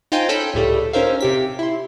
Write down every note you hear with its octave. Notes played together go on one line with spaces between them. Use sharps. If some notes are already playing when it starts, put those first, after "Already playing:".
D#4 F4 C5 G5 G#5
C#4 A4 G5 B5 E6 G6
C#2 A2 G3 A3
C#4 D#4 A#4 C5 E5 F5
C3 G4 B6
E4 C6